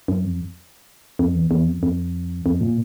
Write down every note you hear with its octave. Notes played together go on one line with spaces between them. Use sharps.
F#2
F2
F2
E2
E2
F2
F2
F2
A#2